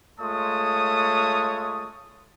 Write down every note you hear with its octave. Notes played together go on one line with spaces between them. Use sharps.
G#3 A3 F4 C#5 A5 D#6